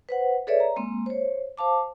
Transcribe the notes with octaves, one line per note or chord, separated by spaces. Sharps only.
B4 C5 F#5
G#4 A4 B4 C#5 D5 E5
A#5
G#3 A#3 C4
C5 C#5
C5 F5 A5 D6